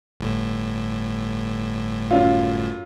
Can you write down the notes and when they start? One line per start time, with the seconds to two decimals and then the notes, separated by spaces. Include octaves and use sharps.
0.20 G1 A2
2.11 F#2 F4